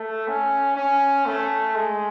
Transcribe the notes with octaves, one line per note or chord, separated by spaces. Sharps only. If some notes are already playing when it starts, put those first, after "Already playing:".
Already playing: A3
C#4
C#4
A3
G#3